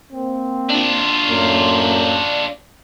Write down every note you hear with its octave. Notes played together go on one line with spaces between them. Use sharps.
A#3 C4
D4 F4
F#2 A2 A#3